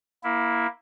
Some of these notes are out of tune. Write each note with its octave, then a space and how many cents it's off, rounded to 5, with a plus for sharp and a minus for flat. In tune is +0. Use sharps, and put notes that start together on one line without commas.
A#3 +15 E4 +0